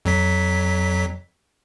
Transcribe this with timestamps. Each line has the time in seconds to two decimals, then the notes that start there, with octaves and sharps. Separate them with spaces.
0.05 F2 F#3 B6